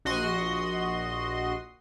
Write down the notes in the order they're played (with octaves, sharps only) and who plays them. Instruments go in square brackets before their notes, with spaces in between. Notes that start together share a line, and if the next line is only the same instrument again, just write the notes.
[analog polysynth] A#1 F#4 D#5 C6